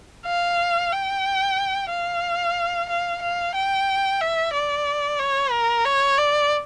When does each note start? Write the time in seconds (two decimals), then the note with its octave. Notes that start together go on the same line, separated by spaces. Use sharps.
0.26 F5
0.92 G5
1.91 F5
2.89 F5
3.22 F5
3.55 G5
4.20 E5
4.53 D5
5.19 C#5
5.52 A#4
5.85 C#5
6.18 D5